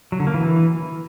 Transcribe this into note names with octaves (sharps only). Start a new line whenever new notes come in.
F#3
D3
A#3
E3